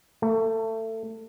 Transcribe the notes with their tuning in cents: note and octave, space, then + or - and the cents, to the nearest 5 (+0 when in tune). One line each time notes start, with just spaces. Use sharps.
A3 +25